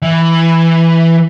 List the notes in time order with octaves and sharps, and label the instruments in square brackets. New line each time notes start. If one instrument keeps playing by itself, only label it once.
[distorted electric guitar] E3